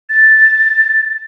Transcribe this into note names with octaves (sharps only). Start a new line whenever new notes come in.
A6